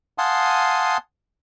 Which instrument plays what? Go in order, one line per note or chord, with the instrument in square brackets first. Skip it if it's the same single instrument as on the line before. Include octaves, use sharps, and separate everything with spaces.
[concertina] F5 F#5 G#5 A5 C6 D#6